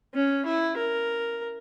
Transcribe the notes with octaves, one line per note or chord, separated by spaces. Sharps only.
C#4
E4
A#4